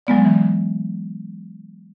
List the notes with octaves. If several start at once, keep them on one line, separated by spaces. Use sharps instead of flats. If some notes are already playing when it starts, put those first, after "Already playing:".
F#3 G#3 B3 D5
E3